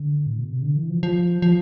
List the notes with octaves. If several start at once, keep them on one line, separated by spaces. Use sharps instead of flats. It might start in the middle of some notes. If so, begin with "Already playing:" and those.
Already playing: D3
A2
B2
C3
D3
E3
F3
F3
F3